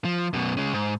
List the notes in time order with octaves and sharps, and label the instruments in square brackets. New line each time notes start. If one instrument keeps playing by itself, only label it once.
[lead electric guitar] F3
F#2 B2
C#3 G#3
G#2